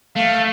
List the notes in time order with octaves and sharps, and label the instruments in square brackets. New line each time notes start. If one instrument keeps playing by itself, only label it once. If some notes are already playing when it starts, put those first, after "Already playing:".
[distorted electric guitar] A3 [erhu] F5